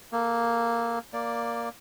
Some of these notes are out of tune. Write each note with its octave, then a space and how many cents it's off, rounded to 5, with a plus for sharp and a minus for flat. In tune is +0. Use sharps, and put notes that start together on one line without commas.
A#3 +0 A4 -25
A#3 +0 D5 +0